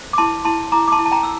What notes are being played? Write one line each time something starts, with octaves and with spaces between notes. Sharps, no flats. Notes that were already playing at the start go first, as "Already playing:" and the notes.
Already playing: C5
D6
E4 A5 C6
E4 A5 C6
E4 A#5 D6
D6
A5 C6
E4
A5
G5 A#5
E6